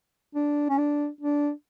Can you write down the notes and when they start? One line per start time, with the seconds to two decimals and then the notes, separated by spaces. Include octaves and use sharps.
0.35 D4
0.70 C#4
0.78 D4
1.21 D4